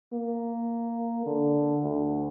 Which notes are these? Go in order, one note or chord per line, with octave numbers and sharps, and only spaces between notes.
A#3
D3
D2